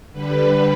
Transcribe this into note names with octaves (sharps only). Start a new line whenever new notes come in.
D3 G3 B4